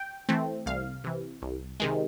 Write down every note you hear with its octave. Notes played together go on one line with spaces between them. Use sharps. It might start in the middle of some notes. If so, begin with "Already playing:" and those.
Already playing: G5
E3 A3 C4
C2 F5
C3 E3
C2
C3 D#3 G#3